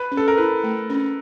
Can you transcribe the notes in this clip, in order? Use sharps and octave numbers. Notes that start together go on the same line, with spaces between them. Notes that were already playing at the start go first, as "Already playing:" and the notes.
Already playing: B4
C#4
A4
A#4
E4 B4
A3
C#4